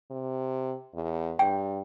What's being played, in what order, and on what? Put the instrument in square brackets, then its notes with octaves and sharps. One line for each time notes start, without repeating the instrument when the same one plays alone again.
[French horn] C3
E2
[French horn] G2 [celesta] G5